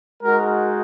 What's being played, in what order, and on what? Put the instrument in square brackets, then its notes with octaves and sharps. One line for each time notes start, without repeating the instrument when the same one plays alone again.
[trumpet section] G#3 D#4 F#4 A#4